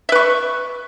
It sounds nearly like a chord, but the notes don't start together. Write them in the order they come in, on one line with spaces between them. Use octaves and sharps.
E5 B4 C#6